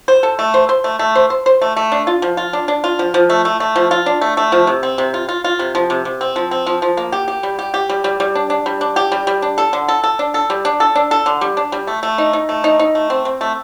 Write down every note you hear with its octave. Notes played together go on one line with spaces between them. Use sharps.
C5
A4
A3
C5
C5
A3
A3
C5
C5
C5
A3
A3
D4
F4
F3
F4
D4
D4
F4
F3
F3
A3
A3
A3
F3
F4
D4
A3
A3
F3
C3
C4
C3
F4
F4
F4
C3
F3
C3
C3
C4
F3
C4
F3
F3
A#3
G4
G4
G3
G4
G4
G3
G3
G3
D4
D4
G3
D4
G4
G3
G3
D4
A4
D3
A4
A4
D4
A4
G3
D4
A4
D4
A4
D3
G3
D4
G3
A3
A3
D#4
D#4
A3
D#4
D#4
A3
C4
C4
A3